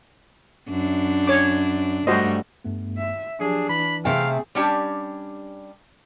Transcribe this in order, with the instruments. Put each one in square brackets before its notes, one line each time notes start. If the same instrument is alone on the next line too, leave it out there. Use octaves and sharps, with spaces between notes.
[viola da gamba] F#2 D4
[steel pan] C#5 D6
[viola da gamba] G2 G3 A3 [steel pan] F#4 C5 D#5
[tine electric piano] G2 A3 B3
[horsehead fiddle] E5
[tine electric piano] F3 F#3 G4 [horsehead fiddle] D4 [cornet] G#4
[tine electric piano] E3 [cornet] B5
[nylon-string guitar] C3 A3 G5 [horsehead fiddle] G#4 [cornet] F5
[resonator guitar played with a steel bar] G3 C#4 D4 G4